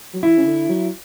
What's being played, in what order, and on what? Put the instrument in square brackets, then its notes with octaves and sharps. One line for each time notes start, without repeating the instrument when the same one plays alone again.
[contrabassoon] F#3
[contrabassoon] E3 [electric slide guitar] E4
[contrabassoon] C#3
D3
F#3